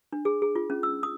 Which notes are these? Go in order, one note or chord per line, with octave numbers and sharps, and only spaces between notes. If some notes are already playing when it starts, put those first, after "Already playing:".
D4
G#4
G#4
F4
C#4
E6
D#6